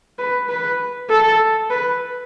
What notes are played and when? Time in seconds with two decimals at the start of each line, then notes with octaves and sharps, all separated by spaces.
0.18 B4
0.49 B4
1.09 A4
1.70 B4